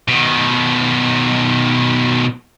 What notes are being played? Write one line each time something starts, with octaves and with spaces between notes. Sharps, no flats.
B2 D#3